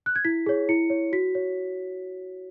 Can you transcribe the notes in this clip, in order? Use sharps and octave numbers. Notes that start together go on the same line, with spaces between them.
F#6
G#6
E4 B6
G#4 C#5
E4 C#7
C#5
F#4 B6
C#5